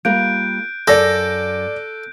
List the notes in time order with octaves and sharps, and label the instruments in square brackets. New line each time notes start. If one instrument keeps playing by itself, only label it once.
[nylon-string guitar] G3 A#3 F4 [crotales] F#6 G6 D7
[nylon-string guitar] F#2 [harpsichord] A4 [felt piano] D5 A#6 [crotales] G6